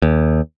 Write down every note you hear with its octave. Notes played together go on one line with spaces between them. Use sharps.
D#2